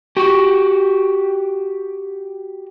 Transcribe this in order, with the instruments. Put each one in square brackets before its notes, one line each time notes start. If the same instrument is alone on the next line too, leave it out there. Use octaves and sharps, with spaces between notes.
[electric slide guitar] F#4 G4